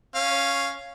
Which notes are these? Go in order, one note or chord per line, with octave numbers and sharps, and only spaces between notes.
C#4 F5